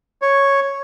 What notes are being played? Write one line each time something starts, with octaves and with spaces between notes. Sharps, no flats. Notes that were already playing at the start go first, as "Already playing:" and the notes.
C#5